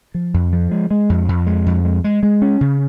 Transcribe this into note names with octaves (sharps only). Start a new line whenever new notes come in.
F3
F2
F3
G#3
G#3
F2
F2
G#3
F2
G#3
G#3
G#3
C#4
C#3